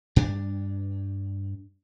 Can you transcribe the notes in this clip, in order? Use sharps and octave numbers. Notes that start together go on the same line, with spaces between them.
G2 D4